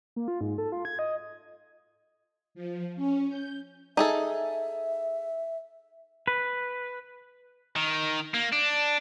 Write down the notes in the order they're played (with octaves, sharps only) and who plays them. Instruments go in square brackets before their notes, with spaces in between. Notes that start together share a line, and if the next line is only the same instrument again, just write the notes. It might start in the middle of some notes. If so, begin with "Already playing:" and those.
[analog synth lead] A#3
F4
G#2
A4
F4
G#6
D#5
[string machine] F3
C#4
G6
[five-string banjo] D#4 G#4 A4 [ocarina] E5
[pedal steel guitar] B4
[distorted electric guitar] D#3
A#3
D4